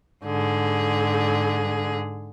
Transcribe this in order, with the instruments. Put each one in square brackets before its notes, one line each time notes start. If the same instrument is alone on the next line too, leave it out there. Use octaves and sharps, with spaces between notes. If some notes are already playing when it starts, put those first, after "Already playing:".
[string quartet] G#2 D3 G#4